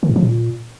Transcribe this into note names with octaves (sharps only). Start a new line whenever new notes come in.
D#3
A2
F3
A#2